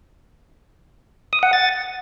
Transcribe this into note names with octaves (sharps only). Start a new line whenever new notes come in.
D#6
F#5
A6